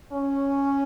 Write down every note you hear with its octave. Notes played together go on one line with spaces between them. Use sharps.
C#4